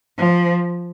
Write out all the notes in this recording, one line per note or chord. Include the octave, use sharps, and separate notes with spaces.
F3